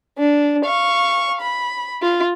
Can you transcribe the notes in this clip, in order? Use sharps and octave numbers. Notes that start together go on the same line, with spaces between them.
D4
F5 C#6
B5
F4